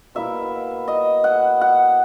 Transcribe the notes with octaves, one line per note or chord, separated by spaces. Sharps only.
B2 A#3 E4 E5
D#5
F#5
F#5